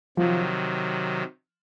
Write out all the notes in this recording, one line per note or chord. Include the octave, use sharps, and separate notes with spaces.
C3 D#3 F3 F#3